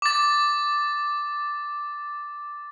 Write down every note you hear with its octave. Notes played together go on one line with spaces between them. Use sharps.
D6 A6